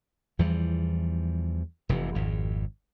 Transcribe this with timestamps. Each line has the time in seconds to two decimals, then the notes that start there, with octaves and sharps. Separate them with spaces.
0.39 E2 E3 F3 G3
1.89 F1 C3 E3
2.14 G#1 F2